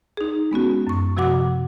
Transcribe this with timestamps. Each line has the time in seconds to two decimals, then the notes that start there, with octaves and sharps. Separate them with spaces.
0.17 D#4 G#4
0.51 G#3 B3 C#4 F#4
0.87 F#2 C#6
1.17 C3 F3 F#4 F#5 D6